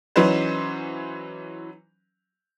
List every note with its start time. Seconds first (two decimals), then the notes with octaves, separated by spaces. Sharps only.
0.16 E3 F#3 C#4 D#4 B4 C5